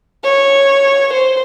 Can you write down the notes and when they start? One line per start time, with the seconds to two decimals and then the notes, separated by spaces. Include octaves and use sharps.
0.24 C#5
1.12 C5